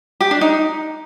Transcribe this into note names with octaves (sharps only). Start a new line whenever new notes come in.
G4
D4
D#4